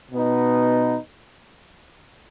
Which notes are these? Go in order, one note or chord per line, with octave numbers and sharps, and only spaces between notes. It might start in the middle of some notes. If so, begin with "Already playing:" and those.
B2 B3 D#4